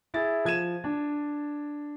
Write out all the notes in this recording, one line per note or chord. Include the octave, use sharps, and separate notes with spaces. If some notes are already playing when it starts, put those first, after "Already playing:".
E4 G#4 A6
F3 G#6 D#7 E7
D4